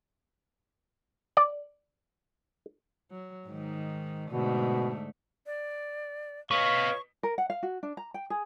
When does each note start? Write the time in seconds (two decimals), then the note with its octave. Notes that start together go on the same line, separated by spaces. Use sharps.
1.37 D5
3.11 F#3
3.47 G#2 D#3
4.31 G#2 B2 D3 A3
5.46 D5
6.51 B4 C#5 D#5 F5 C#6
7.23 A#4
7.38 F#5
7.50 F5
7.63 F#4
7.83 D4
7.97 A#5
8.14 G5
8.30 G#4